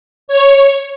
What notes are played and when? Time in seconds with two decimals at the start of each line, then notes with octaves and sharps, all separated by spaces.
0.28 C#5